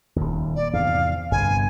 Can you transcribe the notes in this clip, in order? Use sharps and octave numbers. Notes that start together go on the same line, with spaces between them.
D#1 D#2
D5
E2 G#2 C3 F5
G1 G2 C3 G#5